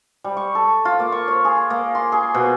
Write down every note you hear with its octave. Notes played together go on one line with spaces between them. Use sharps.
G3
C#6
A4
F4
A#3
C#6
C#5
G#4
A#3
C6
G#4
B2